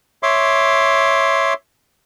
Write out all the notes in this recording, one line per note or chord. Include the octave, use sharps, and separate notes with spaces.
C#5 E5 C6 D6